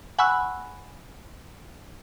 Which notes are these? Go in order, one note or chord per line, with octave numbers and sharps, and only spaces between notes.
F#5 G#5 B5 C#6 E6 F#6